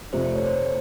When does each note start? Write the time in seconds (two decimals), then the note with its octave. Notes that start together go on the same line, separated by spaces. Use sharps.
0.13 F1 F2 C3 F3 A3 C5
0.24 C5
0.35 C#5
0.46 C5